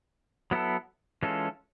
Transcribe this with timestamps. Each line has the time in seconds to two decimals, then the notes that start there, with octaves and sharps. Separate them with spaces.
0.51 F#3 B3 E4 A4
1.23 E3 G#3 C#4 F4 A4